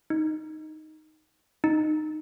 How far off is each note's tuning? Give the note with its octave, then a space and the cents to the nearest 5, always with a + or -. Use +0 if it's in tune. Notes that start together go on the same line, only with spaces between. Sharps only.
D#4 +0
D#4 -15